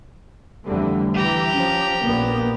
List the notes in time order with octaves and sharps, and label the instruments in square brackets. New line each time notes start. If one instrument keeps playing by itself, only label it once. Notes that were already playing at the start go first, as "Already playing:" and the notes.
[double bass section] F2 D3 E3 [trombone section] G3 A3
[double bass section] E3 [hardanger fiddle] G4 A#5
[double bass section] F3 [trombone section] C#4
[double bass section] A#1 A#2 B3 [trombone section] A#3